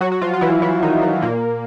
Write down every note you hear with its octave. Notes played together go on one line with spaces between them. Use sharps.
F#3 F#4
F#4
F3 F4
F4
E3 E4
E3 E4
D#3 D#4
D#3 D#4
A#2 A#3